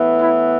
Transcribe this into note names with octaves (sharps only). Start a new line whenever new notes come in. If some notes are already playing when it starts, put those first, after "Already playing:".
Already playing: A2 E3 B3
E4